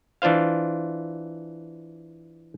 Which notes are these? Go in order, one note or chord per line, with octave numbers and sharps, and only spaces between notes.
E3 D4 F4 C5 F5